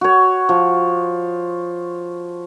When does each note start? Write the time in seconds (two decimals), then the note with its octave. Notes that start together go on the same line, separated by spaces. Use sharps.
0.01 F#4 C#5
0.49 F3